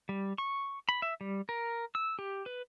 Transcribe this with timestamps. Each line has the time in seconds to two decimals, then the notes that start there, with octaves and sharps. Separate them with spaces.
0.09 G3
0.38 C#6
0.89 B5
1.02 E5
1.21 G3
1.49 A#4
1.95 E6
2.19 G4
2.46 B4